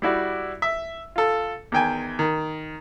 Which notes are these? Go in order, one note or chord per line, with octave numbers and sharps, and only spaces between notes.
G3 E4 F#4 D5
E5
F4 A4
E2 D#3 G5 G#5
D#3